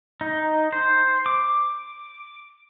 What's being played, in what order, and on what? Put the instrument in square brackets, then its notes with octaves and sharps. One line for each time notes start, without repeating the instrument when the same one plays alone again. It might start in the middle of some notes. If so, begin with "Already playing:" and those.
[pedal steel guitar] D#4
C5
D6